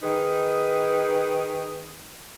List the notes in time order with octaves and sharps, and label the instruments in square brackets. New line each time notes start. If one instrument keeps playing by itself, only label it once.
[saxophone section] D#3 D#4 G#4 B4